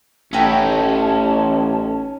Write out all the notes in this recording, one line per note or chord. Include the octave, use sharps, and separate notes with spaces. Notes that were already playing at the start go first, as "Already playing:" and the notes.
A1 C#4 D#4 E4 F#4 G4 A5